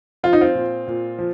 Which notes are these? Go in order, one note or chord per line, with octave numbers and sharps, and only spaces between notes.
F3 F4
D#4
C4 F4
A#2
A#2
F3